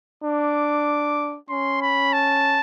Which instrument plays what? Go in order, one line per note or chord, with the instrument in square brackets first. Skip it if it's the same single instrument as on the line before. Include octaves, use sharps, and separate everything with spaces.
[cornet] D4 [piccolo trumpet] D6
[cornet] C#4 [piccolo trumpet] C6
[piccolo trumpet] B5
A5